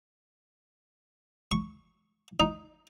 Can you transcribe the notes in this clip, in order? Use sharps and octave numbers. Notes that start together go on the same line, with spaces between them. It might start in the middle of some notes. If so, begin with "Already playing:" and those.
C#6
D#4